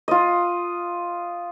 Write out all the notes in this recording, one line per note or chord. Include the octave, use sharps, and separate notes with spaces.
F4 D#5